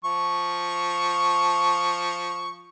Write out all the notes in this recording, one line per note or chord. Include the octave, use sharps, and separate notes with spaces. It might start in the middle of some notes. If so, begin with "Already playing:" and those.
F3 C#6